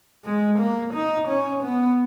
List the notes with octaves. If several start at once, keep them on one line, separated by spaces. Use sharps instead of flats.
G#3
A#3
D#4
C#4
B3